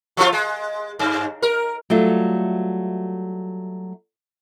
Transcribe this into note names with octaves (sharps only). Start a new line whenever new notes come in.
F3 A3 F4
G#3
G2
A#4
F#3 G3 A3 F4